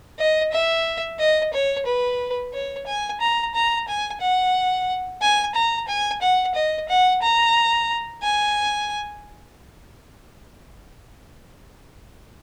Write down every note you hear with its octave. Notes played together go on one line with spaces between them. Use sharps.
D#5
E5
D#5
C#5
B4
C#5
G#5
A#5
A#5
G#5
F#5
G#5
A#5
G#5
F#5
D#5
F#5
A#5
G#5